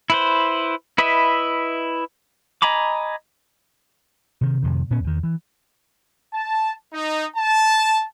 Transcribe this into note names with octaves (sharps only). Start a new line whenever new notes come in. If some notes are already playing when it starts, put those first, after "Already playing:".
E4 B4 C5
E4 B4 D#5 E5 B5
D#5 G#5 A#5 B5 D6
C3 D#3
F2 C3 D#3
A#2 B3 C#4
E2 D#3
E3
A5
D#4
A5